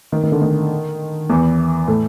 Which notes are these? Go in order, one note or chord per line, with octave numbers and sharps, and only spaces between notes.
D#3
D#3
D3
D#3
E2 E3
A2 A3